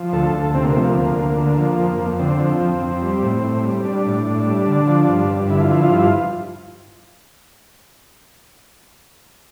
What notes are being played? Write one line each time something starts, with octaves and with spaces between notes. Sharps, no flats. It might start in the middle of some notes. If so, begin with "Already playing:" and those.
Already playing: F3
D2 A4
D2
C3 C4
A#3
F3 A3
A#3
D2
D2
D3
F3
F2
F2
D3 C4
F3
F2
F2
G3
A2
A2
G3
G3 D4
A2
A2
G3
D3
F3
G2
G2
D3 E4
F4
F3 E4
F4
G2 E4
F4